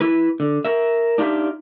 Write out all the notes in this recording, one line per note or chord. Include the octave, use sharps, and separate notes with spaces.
E4 B4
D3
A#4 E5
D4 D#4 F4 G4 E5